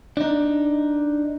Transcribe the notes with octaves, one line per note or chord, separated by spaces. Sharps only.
D4 D#4